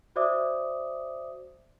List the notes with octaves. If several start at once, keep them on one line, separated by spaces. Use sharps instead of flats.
F#4 C5 D5 E5 D6 D#6